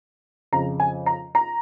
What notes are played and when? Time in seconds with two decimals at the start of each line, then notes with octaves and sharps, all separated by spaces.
0.52 F2 C#3 A#5
0.80 G#5
1.06 A#5
1.35 A#5